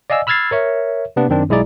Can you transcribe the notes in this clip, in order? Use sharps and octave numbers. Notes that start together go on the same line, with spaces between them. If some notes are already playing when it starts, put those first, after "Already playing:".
D5 D#5 F5 G#5 E6
B5 E6 F6 G#6 A6 C7
A#4 C#5 E5
C3 A#3 B3 D4 B4
F#2 D#3 C4 D4
B1 G#3 E4 G#4 D5 A#5